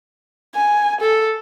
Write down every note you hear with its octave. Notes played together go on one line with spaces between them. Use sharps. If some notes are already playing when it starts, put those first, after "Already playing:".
G#5
A4